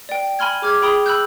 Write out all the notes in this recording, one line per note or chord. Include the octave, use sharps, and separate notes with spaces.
D5 G5
G#5 B5 C6 F6 G#6
G#4 D6 F6 G#6
G#4 G5 B5 C6 D#6 F7
B5 E6 F#6 G6